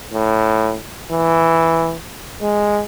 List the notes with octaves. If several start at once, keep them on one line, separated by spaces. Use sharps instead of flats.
A2
E3
G#3